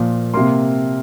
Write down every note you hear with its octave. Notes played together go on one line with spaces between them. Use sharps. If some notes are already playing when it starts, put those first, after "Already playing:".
Already playing: A#2 F3 A#3
C3 A#3 C6